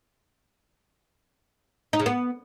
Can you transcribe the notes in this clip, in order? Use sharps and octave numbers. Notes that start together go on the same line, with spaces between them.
D#4
C#3
B3